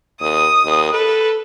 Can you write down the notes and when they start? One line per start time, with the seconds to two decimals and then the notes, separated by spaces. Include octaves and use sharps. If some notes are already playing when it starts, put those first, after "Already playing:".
0.21 D#2 D#6
0.64 D#2
0.94 A4 B4